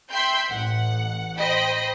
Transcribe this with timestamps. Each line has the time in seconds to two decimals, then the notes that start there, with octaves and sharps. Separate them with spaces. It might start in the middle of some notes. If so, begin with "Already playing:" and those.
0.11 E5 G5 B5 C6 G6
0.48 A1 F#5
1.37 C5 D#5 G5 B5